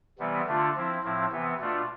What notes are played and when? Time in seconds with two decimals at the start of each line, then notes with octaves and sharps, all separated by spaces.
0.19 C3 E3 G3 B3
0.47 D3 A3 D4 F4
0.75 F3 C4 E4
1.03 A2 F3 C4 E4
1.32 C3 E3 B3
1.60 B2 A3 D4 F4